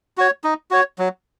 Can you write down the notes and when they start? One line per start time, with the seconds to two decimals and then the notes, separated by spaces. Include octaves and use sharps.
0.17 F#4 C#5
0.44 D#4
0.71 F#4 C#5
0.99 F#3